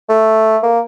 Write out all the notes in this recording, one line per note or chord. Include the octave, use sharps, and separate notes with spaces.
A3
A#3